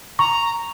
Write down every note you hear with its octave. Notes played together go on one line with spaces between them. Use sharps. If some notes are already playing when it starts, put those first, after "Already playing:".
A#5 C#6